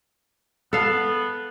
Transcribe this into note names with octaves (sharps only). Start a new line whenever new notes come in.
B3 A4 F5